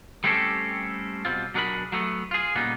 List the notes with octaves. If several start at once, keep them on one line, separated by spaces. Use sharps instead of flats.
G3 A3 C4 C#4 G4 A4
B2 G3 C4 F4
B2 F#3 D4 G#4 A#4 B5
F#3 A3 B3
F4 G#4
A#2 C#3 G3 B3 D#4